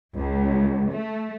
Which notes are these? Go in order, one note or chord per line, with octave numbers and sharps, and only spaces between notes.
C#2
A3